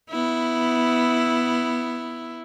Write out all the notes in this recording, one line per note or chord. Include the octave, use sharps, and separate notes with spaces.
B3 E4